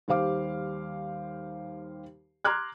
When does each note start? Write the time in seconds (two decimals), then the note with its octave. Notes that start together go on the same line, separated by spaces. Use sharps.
0.08 D#2 G3 C5 F5 D6
2.45 A#5 C6 D6 F6 F#6 G#6